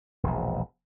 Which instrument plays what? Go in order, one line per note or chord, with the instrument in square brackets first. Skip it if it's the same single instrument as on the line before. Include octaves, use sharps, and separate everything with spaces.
[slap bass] E1 A#1